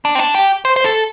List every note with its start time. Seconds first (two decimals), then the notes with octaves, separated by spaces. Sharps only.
0.05 D4
0.15 C4
0.19 D4
0.34 G4
0.65 C5
0.76 C5
0.84 A4